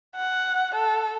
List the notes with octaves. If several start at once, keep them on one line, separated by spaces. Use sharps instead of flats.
F#5
A4